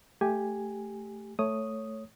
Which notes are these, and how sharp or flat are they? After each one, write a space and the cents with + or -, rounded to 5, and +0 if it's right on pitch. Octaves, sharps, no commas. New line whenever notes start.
A3 +0 G4 +5 G#5 +0
A3 +0 C#5 +0 D#6 +0